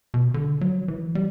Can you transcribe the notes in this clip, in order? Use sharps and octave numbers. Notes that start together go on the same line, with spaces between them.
B2
D3
F#3
E3
G3